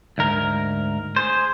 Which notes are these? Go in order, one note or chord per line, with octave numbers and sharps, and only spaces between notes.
D2 G#2 A#4
G#4 C5